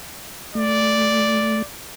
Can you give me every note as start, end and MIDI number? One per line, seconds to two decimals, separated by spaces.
0.55 1.62 57
0.55 1.64 74